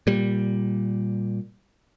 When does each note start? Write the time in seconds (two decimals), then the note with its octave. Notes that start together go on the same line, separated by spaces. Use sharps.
0.07 A#2 G3